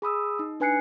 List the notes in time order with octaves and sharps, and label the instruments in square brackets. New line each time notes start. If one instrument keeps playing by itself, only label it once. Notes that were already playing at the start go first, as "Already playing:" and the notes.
[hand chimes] G#4 B5 D#6 E6
D#4
D4 B4 G#5 F#6 C7 C#7